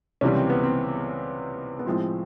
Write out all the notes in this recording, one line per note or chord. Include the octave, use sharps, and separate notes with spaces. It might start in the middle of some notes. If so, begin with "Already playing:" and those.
C#2 C3 E3 G3 C#4
C4
B3
C4
B3
A2 F3 G#3 C4